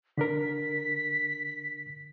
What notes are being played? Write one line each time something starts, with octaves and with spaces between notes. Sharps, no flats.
D3 D4 A#4 B6